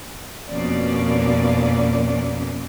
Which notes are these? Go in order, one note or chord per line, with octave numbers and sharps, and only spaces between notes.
F2 B2 A#3 C#4 D5